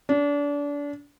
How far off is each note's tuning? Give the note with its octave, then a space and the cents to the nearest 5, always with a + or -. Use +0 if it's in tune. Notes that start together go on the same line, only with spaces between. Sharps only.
D4 -30